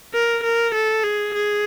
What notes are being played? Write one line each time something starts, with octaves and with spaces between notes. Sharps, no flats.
A#4
A#4
A4
G#4
G#4